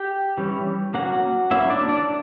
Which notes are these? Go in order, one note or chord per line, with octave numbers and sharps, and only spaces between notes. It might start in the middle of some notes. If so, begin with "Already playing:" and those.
Already playing: G4 G5
E3 G3 C#4
F#3 A#3 C#4 F#4 F#5
F#3 A#3 C#4 E4 E5
D4 D5
D4 D5